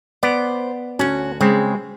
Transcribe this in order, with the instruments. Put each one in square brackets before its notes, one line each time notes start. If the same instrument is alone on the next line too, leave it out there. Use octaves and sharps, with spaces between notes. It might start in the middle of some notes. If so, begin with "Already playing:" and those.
[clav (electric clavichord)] B3 D5 [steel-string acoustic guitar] C5
[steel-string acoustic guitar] D2 F#4 [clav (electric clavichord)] C#4
[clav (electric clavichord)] C#3 C4 [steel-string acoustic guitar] G#3